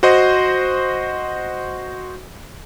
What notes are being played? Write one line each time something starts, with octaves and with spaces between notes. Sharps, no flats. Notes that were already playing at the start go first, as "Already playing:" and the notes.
F#4 C5 D#5